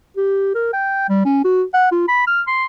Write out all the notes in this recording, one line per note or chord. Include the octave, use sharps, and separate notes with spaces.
G4
A#4
G5
G3
C#4
F#4
F#5
F4
B5
F6
C6